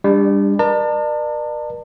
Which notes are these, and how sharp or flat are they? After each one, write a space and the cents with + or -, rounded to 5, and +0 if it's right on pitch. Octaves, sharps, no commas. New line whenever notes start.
G3 +30 D4 +0
A#4 +45 D5 +40 A5 +35